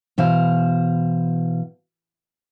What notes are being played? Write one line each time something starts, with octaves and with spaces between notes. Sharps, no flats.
B2 E3 C5 F5